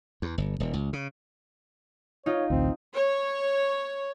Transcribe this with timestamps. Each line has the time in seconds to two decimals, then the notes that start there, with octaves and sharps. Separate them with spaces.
0.22 E2
0.38 G1
0.60 D#1
0.73 C#2
0.93 C#3
2.26 D#4 F4 C#5
2.50 A1 D2 C4
2.94 C#5